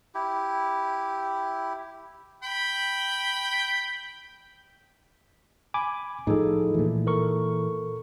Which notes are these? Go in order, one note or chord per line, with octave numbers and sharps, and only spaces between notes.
E4 G4
G5 B5
G#5 B5 D6
A2 F3 D#4 G#4 A4
A#2 E3
A4 A#4 C#6